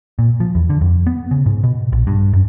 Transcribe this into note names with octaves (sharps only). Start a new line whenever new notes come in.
A#2
F3
E2
D3
F2
B3
C#3
G#2
B2
A#1
G2
F#2